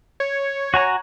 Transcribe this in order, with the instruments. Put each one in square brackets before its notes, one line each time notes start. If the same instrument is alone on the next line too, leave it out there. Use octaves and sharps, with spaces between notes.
[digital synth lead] C#5
[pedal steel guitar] F#4 G#5 A#5